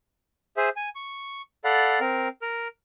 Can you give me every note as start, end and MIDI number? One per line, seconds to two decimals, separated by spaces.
0.57 0.69 68
0.57 0.69 72
0.57 0.69 76
0.76 0.89 80
0.95 1.42 85
1.64 1.99 69
1.64 1.99 74
1.64 1.99 77
1.64 1.99 78
1.64 1.99 83
2.00 2.28 60
2.00 2.28 70
2.00 2.28 89
2.42 2.68 70
2.42 2.68 89